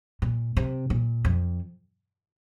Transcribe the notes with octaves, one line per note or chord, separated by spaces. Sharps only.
A#2
C3
A#2
F2